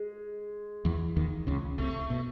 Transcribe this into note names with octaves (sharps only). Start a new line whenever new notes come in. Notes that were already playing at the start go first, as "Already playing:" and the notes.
Already playing: G#3
E2 E3
D#2 D#3
C#2 C#3
C2 C3 A3
B2